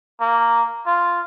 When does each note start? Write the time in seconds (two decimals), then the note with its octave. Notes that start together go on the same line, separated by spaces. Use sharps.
0.21 A#3
0.86 F4